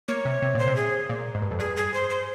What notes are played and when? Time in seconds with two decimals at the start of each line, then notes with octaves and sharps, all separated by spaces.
0.08 A#3 C#5
0.25 C3
0.42 C3
0.55 A#2 C5
0.68 C3
0.76 G#4
1.09 A#2
1.35 G#2
1.42 G2
1.51 F2
1.59 G2 G#4
1.77 G#4
1.94 C5
2.10 C5